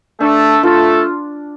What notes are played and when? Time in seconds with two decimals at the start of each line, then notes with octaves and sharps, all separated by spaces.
0.20 A3 D4 A4
0.63 A3 F4 A4